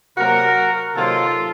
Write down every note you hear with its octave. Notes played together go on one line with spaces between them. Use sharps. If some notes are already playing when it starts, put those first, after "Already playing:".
C3 F#3 A#3 F#4 A#4
C3 D#3 F#3 A#3 F4 A4